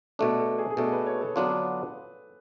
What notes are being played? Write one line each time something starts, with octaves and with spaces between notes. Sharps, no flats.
B2 A3 D4 A4
A4
G#4
G#4
B2 A3 D4 A4
B4
C#5
A4
D3 F#3 B3 D4 F4 B4